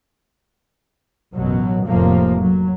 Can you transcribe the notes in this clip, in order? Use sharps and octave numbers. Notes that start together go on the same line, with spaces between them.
A1 F#2 B2 F#3
F1 A2 F3 A#3
F#3